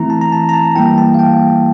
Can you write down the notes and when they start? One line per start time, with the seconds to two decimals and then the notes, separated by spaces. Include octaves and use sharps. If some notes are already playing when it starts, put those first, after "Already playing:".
Already playing: E3 A3 C4 E4 A#5
0.10 A5
0.21 A#5
0.32 A5
0.49 A#5
0.53 A5
0.76 E3 G3 A#3 E4 G5
0.98 A5
1.14 F5
1.19 G5